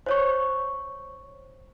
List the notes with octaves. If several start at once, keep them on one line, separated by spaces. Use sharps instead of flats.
C5 C#5 C#6